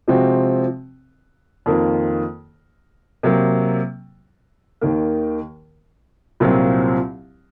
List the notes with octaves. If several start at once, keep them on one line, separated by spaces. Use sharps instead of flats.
C3 F3 G#3 C4 F#4
F2 D#3 A#3 F4 A#4
C3 F#3 A#3
D#2 D#3 A#3
C2 A#2 F#3 C4 F4